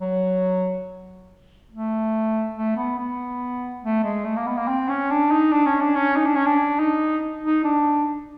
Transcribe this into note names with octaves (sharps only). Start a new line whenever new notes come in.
F#3
A3
A3
B3
B3
A3
G#3
A3
A#3
B3
A#3
C4
C#4
D4
D#4
D4
C#4
D4
C#4
D#4
D4
C#4
D4
D#4
D#4
D4